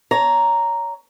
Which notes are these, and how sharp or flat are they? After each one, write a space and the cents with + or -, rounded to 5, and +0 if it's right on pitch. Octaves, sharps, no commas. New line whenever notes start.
C#5 +30 A#5 +0